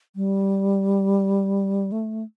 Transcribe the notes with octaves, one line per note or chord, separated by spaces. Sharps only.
G3
A3